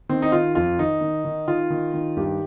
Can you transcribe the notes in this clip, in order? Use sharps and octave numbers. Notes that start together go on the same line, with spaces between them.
D#3 C4
D#4
D#3 F4
F2 F4
D#3 D#4
D#3
D#3
D#3 F4
D#3
D#3
G2 G4